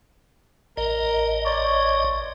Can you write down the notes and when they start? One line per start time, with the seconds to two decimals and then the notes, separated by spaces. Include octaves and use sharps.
0.77 A1 A#4 D#5
1.46 C#5 D5